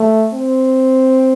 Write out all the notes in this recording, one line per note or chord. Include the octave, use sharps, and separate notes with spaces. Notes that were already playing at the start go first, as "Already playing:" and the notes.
Already playing: A3
C4